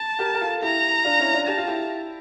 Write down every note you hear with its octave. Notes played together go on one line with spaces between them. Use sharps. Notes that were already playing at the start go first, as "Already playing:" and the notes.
Already playing: A5
G4 A#4
A#4
F4 A4
E4 G4 A#5
D4 F4
C#4 E4
D4 F4
G4 A5
F4
E4 G4